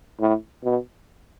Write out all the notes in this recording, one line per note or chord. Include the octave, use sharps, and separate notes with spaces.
A2
B2